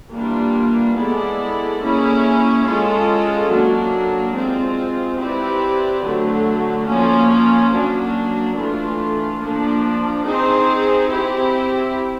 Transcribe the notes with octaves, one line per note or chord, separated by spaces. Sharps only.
E3 G3 A#3 D4 F4
G#3 B3 E4 A4 D5
A#3 C#4 E4 G#4
G#3 C#4 F4 A4
F#3 A#3 D4
G#3 C4 F4
C4 E4 G4 B4 D5
D3 F#3 A3
F3 A#3 C#4
F#3 A#3 D4
E3 A3 D4 F4
F3 A#3 D4
C4 D#4 G#4 C5
C4 E4 G4